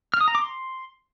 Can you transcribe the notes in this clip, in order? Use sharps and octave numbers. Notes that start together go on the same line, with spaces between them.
F6
D#6
A#5
D6
C6